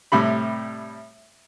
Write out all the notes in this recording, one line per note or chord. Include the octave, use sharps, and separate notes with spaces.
A2 C3 G3 B5